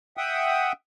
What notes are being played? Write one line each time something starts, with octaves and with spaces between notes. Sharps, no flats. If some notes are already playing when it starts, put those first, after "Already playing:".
E5 F#5 G5 D#6